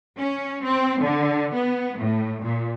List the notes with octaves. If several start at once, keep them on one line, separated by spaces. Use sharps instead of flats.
C#4
C4
D3
B3
A2
A#2